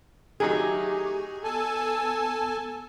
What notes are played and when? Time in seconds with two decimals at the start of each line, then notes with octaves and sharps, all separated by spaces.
0.40 D#3 F#3 A3 D#4 G4 G#4
1.44 B3 A4 G#5 A5